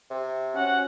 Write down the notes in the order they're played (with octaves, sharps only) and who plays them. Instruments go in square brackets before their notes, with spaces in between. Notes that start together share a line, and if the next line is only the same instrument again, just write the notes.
[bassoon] C3
[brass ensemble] C#4 F#4 [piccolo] F#5